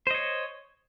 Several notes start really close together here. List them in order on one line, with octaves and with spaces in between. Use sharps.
C5 D#5 C#5